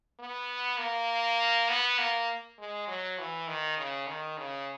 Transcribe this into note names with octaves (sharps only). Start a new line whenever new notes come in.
B3
A#3
B3
A#3
G#3
F#3
E3
D#3
C#3
D#3
C#3